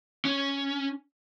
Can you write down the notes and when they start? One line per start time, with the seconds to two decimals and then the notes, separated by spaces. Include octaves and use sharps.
0.25 C#4